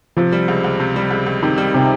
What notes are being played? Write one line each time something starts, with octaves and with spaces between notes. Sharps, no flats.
C3 F3
G3
C#2
C#2
C3
G3
C#2
C#2
C3 D#3
G3
C3